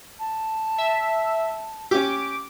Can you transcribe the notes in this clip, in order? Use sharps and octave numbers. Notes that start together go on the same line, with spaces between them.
A5
E5
C#4 G4 D6